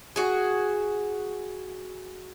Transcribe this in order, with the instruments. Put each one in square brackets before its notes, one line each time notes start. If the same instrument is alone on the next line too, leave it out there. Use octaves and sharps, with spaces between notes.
[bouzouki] F#4 G#4